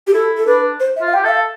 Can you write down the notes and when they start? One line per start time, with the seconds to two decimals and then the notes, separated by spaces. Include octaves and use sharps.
0.07 G4
0.14 E4 A4
0.37 A4
0.47 D4 B4
0.80 C5
0.96 E5
1.01 F4
1.07 F5
1.14 G4 G5
1.24 A4 E5
1.29 F5